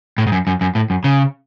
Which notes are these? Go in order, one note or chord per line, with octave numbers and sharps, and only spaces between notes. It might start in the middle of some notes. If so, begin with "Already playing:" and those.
A2
G#2
F#2
F#2
F#2
A2
F#2
C#3